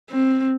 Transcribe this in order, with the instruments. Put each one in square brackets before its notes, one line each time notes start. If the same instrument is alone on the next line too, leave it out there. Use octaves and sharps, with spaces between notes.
[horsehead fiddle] C4